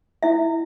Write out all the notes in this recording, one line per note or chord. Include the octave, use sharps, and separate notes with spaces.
E4 E5